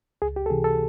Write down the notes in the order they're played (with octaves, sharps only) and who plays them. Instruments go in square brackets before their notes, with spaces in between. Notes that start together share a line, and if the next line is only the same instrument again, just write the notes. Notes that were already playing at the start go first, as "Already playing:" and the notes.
[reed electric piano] C#2 G#4
G4
A4
C3 E3 G#4
A4